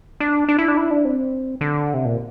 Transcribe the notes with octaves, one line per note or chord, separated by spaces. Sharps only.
D4
D4
E4
D4
E4
D4
C4
D3
C3
A#2